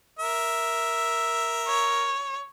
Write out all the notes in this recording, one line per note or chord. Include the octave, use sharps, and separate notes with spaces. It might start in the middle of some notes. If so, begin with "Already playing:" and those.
A#4 E5
C#5